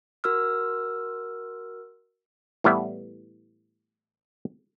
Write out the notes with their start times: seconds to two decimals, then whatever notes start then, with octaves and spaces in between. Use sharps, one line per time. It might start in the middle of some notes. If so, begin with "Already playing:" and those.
0.24 F#4 A#4 E6 F6
2.64 A2 E3 G3 B3 E4